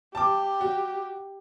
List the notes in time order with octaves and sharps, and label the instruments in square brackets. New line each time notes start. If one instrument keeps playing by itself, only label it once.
[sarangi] G4 [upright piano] A5 D6
[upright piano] F#4